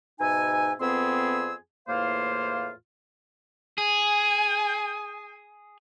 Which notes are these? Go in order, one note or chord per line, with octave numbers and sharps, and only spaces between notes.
G#2 B2 D#4 E5 G#5
F2 B3 C4 G#4 C6 E6
E2 A2 A#3 F4 C5 F5
G#4 G#5